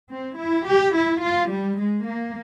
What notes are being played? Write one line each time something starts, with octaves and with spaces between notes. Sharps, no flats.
C4
E4
G4
E4
F4
G3
G#3
A#3